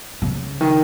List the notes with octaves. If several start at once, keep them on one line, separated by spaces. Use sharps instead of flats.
C#3
D#3